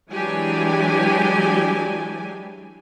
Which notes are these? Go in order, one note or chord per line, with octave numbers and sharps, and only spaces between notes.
E3 F#3 G#3 D4 G4 G#5